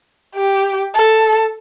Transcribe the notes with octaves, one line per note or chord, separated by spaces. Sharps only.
G4
A4